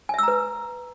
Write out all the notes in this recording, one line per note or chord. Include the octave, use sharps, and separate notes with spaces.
B4 E5 G#5 A#5 E6